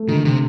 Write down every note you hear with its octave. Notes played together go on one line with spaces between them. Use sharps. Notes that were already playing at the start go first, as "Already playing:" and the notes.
Already playing: A3
D3 D#3
C3